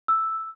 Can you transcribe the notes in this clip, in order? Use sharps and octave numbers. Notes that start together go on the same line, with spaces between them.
E6